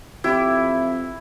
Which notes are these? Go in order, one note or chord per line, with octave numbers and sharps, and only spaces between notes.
F2 E4 G4 E5